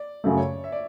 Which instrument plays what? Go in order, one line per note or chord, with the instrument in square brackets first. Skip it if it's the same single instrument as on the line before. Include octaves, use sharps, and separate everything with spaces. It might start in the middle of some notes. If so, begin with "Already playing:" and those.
Already playing: [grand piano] D5
[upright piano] F#2 C#3 F#3 A3
[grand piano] C#5
E5
D5